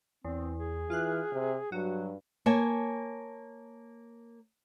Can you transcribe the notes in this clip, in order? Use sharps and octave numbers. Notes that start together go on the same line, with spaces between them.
E2 C4
G#4
E3 F4 F6 F#6
C3
G2 F#3 F#4
A#3 C#5 G#5 A5